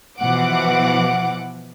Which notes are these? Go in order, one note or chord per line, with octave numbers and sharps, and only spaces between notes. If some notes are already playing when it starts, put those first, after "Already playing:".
B2 E3 F3 F#5 D6